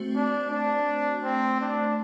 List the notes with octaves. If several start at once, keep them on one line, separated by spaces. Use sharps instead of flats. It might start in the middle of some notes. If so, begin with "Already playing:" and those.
Already playing: A3 C4 F#4 C5
D4
D4
C4
D4